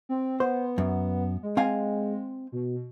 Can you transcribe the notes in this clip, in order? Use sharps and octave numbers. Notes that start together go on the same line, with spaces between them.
C4
B3 C5
F#2
G#3
C4 F5 G#5
B2